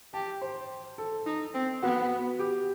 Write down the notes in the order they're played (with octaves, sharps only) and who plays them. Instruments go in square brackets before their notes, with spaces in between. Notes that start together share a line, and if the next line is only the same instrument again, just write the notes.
[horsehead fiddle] G4 [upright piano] A5
[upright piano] C5
A4
[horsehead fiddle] D#4
C4
[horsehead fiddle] B3 [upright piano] F#4
[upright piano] G4